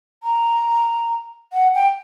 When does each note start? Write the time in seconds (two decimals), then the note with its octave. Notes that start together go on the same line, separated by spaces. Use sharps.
0.23 A#5
1.52 F#5
1.74 G5